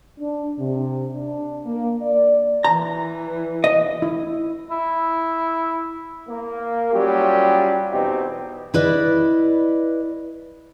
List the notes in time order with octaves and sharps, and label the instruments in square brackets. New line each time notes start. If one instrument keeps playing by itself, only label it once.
[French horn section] D4
C3
D4
A#3
D5
[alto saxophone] E3 [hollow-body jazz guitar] A#5
[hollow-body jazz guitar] D#5
[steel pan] E4
[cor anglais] E4
[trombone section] A#3
F#3 G3 C#4 F4 G4
E2 B2 C4 D#4 G4
[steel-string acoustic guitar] E4 B4 D5 D#5